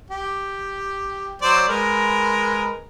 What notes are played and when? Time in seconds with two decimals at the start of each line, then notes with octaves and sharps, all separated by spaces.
0.10 G4
1.42 F#3 C5 D5
1.68 G#3 A#4 B4